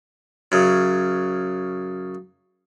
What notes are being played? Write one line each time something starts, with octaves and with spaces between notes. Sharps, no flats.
F#2 C#3